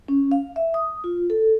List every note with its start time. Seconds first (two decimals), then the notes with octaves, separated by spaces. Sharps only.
0.08 C#4
0.32 F5
0.56 E5
0.74 D#6
1.04 F4
1.30 A4